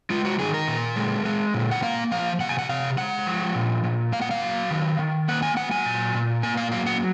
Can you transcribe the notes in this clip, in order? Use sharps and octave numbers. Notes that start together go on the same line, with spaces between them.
G#3 F4
F#4
D#3 G#4
A#4
A#2
G#3
G#3
A#2
F#5
A#3 F5
F3 F5
C3 F#5
G#5
F#5
C3 F5
G#3 F#5
F3
A#2
A#2
A#3 F5
F#5
F5
F#3
D#3
D#3
A#3 F#5
G#5
F#3 F#5
G#5
A#2
A#2
A#3 G#5
F5
F#3 F5
F#5